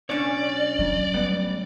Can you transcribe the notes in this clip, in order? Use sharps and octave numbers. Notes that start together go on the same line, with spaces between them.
B1 C#4 D4 C#5 D5
A#2 D3 F#3
A2 G3 B3